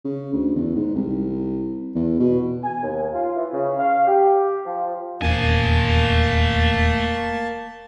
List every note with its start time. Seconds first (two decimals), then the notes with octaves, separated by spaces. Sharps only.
0.05 C#3
0.33 D2
0.55 E2
0.75 G#2
0.95 C2
1.95 E2
2.20 B2
2.63 G#5
2.83 D#2
3.13 F4
3.36 E3
3.53 C#3
3.79 F5
4.07 G4
4.66 F3
5.22 D#1 E2 A3 A#3 C#4 G#5 A5